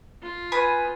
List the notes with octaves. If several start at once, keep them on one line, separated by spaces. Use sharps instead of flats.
F4
B4 G#5 D#6